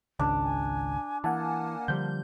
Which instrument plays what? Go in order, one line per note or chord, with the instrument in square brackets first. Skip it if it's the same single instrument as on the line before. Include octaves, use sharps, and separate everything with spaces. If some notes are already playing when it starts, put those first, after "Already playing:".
[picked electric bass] G#1 C#2 C#3 [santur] D4
[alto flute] G#5
[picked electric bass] E3 [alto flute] A#3 [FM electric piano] F#5 G#5 A5
[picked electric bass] D3 F3 G3 [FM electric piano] G6